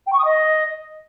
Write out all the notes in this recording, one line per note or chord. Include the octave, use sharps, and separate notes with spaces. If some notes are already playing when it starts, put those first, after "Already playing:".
G5
C#6
D#6
D#5